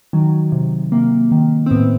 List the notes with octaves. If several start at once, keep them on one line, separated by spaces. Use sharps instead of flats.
D#3 F#3
C3
C3 A#3
D#3
C4
A2 B3